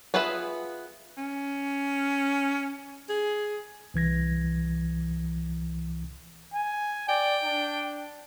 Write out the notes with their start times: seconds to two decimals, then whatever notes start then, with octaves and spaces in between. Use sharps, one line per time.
0.14 B3 F4 G#4 B4 E5
1.17 C#4
3.09 G#4
3.94 C2 E3 G#6 A#6
6.54 G#5
7.09 D5 G5
7.44 D4